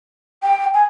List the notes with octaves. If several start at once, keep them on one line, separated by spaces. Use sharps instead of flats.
G5
G#5